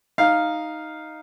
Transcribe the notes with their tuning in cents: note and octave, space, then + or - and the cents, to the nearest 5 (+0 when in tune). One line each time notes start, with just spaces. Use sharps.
D#4 +0 F5 +0